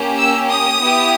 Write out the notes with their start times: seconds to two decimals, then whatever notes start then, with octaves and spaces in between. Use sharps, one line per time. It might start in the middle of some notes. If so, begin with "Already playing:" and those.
Already playing: A#3 C#4 G4
0.18 E6
0.50 D#6
0.82 B3 E4 G4